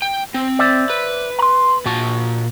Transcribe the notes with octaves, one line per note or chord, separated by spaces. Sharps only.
G5
C4
C5 D5 E5
B4
A#5 C6
A#2 F#4 A5